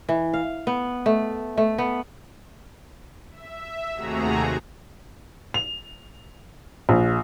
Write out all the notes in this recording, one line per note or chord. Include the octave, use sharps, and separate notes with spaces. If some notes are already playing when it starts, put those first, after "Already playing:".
E3
F5
B3
A3
A3
B3
E5
D#2 C3 A3 F#4 G#4 A#5
F7
A#1